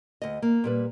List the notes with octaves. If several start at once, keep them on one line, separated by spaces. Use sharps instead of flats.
D2 D#5
A#3
A#2 G3 B4